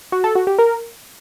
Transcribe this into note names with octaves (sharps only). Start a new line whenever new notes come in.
F#4
A4
F#4
G4
A#4